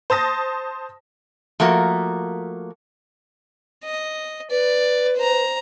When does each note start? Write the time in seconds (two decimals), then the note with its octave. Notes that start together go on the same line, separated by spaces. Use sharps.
0.10 C5 A5 D#6 A#6
1.60 F3 A3 A#3 F#4 A#4
3.84 D#5
4.50 B4 D5
5.17 C5 A#5